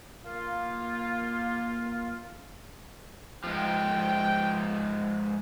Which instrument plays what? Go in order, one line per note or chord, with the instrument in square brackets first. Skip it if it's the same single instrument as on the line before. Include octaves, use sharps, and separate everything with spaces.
[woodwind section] A#3 F4
[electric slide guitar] G#2 F3 [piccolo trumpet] G5